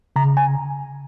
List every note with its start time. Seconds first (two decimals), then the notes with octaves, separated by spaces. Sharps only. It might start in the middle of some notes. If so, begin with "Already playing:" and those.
0.16 C#3 A#5
0.37 G#5